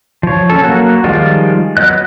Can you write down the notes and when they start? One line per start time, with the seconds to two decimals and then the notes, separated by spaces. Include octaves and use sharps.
0.23 F3 C#5
0.50 C#4 A4
0.62 F#3 A#3 F#4 F#6
1.04 D#3 F3 G3 G#3 F4
1.77 F#3 B3 D#5 F#6